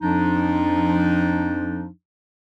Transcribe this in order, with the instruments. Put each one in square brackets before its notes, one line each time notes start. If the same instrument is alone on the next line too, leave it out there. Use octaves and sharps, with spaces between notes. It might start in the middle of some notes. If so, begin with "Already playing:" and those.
[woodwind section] F2 F3 D4 D#4